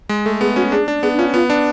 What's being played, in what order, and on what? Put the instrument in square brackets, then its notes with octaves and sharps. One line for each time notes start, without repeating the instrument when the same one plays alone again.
[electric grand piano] G#3
[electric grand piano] A3 [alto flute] A4
[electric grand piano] B3 [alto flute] G#4
[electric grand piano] C#4 [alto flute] F#4
[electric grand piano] D4 [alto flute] G#4
[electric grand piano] D4
[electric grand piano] B3 [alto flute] G#4
[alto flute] D4
[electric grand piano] C#4 [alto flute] F4
[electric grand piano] B3 [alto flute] F4
[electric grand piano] D4